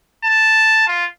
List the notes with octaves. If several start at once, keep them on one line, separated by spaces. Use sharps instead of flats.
A5
F4